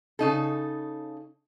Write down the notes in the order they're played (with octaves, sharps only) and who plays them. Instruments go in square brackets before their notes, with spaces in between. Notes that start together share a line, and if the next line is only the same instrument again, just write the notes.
[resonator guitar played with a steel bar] C#3 D#4 A4